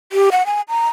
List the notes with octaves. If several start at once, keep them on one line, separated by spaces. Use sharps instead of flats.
G4
F#5
G#5
A#5